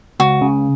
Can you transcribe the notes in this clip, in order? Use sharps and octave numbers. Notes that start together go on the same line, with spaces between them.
C#2 F#4
C#3